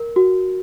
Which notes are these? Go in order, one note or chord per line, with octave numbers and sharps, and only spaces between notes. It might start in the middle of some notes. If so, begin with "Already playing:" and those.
Already playing: A#4
F#4